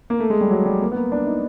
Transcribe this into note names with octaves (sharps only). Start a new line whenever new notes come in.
A#3
A3
G#3
G3
F#3
G3
A#3
B3
A#3
D4
D#4